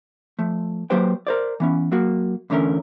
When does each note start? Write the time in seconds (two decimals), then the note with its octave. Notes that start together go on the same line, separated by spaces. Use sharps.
0.39 F3 A3
0.90 F#3 A#3 G4 B4 C5 G5
1.27 A#4 C5 D5
1.60 E3 B3 C#4
1.92 F#3 A#3 F#4
2.50 E2 D3 A3 C#4 A#4